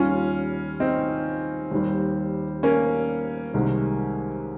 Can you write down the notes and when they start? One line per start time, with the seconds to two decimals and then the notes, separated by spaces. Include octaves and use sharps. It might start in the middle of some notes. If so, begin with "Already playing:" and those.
Already playing: D#2 D#3 G3 C#4 F4
0.80 C4 D#4
1.71 D#2 D#3 G3
2.63 A#3 C#4
3.54 C2 C3 D#3 G#3